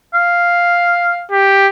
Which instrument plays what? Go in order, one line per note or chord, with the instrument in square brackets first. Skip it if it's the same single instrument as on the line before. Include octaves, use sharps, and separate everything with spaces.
[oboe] F5
[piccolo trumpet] G4